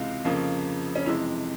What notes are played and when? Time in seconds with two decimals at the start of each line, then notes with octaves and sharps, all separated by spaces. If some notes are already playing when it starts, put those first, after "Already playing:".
Already playing: C#2 C3 E3 G#3 F4
0.24 F2 C#3 F3 A#3
0.95 C#4
1.06 F2 C3 E3 G#3 E4